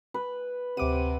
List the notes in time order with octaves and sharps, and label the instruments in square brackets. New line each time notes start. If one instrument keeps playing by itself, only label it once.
[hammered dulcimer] B4
[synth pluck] D2 D6 D#7 [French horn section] C3 [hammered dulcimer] F#5